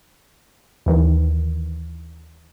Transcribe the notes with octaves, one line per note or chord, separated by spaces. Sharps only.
D#2 D#3 E3